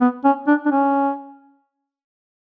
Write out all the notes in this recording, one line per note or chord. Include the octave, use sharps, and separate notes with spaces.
B3
C#4
D4
D4
C#4